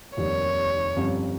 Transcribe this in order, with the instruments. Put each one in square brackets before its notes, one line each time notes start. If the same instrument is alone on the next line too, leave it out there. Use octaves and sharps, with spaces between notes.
[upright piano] F1 D#2 D#3 G3 [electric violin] C#5
[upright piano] G1 F2 C3 G3 C#4